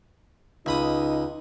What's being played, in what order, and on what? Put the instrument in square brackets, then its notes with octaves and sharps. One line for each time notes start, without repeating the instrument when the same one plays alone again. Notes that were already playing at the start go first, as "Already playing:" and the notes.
[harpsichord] C#2 B5 D#6 [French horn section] D#4